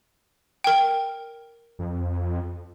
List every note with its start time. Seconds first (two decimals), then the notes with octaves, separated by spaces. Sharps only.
0.64 A#4 G5
1.79 F2